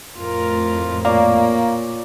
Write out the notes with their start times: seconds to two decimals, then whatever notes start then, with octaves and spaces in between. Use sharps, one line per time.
0.19 F2 A2 F4 A#4
1.05 A#2 A#3 C#5 D5 F5 A#5